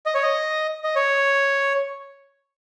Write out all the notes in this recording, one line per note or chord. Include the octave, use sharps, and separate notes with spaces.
D#5
C#5
D#5
D#5
C#5